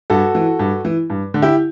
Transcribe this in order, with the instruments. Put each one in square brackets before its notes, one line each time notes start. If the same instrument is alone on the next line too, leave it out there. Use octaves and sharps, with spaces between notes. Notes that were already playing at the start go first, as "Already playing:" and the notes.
[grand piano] G2 F#4 A4
E3
G2
E3
G2
D3
E4 G4